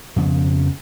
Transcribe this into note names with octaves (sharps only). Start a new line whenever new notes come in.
F2 C#3 F3 B3